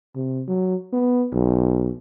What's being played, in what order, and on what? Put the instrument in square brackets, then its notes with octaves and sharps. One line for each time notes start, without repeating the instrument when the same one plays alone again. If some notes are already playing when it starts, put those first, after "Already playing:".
[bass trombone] C3
F#3
B3
B1